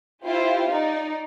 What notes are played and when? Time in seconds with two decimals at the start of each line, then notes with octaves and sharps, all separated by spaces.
0.25 E4 F4 G4 C5
0.69 D#4 D5